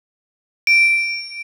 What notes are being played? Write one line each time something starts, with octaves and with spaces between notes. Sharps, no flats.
D7